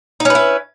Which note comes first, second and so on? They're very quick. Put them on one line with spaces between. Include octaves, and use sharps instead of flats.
D#4 C#4 B4 E4